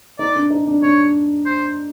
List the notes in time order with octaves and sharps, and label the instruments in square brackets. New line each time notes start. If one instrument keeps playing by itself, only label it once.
[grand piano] D#4 [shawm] D5
[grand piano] D4
D#4
D4
[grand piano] D4 [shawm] C#5
[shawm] C5